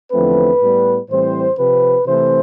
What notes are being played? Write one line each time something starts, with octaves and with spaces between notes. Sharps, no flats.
E2 D3 F3 A3 C4 B4
A2 G3 B3
A2 E3 G3 C4 C5
C3 F3 C4 B4
C3 E3 A3 C4 C5